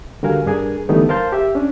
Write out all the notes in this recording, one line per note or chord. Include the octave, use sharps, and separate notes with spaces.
D3 G3 F#4 A#4 F5 G#5
G2 D4 G#4 A#4 G#5
D3 E3 G3 A3 B3 D#4
A#4 C5 F5 A5 C6 G6
G4 E5
C#4 D4